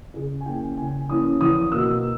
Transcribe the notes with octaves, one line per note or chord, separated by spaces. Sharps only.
C#3 G#4
G#5
E3 A#3 C#4 G5
C#3 G#5
E3 A#3 C#4 D#6
E2 D#6
B2 A#3 E6